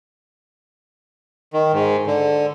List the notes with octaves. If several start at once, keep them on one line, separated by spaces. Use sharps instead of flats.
D#3
G#2
D3